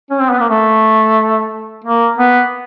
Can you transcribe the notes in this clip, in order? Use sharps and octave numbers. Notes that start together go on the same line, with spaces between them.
C#4
C4
B3
A#3
A3
A#3
B3